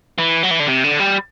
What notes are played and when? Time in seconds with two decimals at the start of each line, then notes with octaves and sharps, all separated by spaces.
0.18 E3
0.43 F#3
0.51 E3
0.60 D3
0.68 C3
0.84 D3
1.00 G3